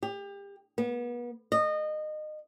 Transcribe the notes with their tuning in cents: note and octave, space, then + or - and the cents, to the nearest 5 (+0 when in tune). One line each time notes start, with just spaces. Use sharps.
G4 +30
B3 -35
D#5 -25